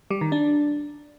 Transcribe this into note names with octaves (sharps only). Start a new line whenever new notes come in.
G3
D#3
D4